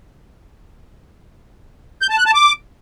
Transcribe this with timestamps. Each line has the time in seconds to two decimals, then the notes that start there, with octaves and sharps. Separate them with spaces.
2.02 G6
2.10 A5
2.18 F#6
2.26 A5
2.34 D6